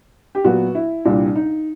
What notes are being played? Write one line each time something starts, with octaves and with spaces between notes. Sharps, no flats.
G4
A#2 F#3 B3 F#4
E4
C2 A#2 G3 D4
D#4